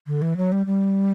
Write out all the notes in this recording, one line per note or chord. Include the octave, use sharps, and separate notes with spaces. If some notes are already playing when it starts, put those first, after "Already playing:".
D3
E3
F#3
G3
G3